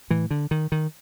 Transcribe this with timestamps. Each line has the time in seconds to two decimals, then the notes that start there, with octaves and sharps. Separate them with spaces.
0.10 A2 E3
0.31 D3
0.51 D#3
0.72 D#3